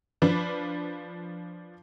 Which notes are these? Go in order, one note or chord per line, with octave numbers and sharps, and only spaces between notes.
F3 D4 B4